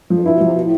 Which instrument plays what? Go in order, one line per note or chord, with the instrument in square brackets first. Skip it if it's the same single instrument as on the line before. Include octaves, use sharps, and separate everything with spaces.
[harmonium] F2 [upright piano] F3
[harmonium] G2
[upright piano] E4
[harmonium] B2
[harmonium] C3 [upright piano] F3
[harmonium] B2
A2